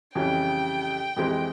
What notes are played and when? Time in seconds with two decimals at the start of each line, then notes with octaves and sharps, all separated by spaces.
0.15 F2 C#3 E3 G3 C#4 G5
1.16 F2 E3 G#3 C4 G4